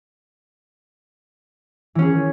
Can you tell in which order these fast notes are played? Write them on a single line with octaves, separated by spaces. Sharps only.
E3 C#4 G#4